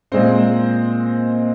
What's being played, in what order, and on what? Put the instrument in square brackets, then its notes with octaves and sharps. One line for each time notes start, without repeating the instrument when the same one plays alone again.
[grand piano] A#2 G#3 C4 C5